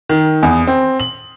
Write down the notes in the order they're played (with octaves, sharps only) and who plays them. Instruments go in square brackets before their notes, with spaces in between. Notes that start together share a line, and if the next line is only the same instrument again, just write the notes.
[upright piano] D#3
E2
C4
F#7